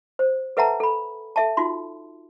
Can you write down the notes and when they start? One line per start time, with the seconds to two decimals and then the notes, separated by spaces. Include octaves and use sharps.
0.19 C5
0.57 A4 B4 E5 F#5 A5 A#5
0.80 A4 B5
1.36 A4 E5 A5
1.57 D#4 F4 F#4 C6